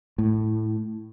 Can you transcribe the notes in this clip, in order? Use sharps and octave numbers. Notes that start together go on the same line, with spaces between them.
A2